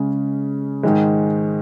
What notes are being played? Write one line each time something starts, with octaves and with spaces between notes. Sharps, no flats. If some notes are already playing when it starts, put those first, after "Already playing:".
Already playing: C#3 G#3 C#4
G#2 D#3 G#3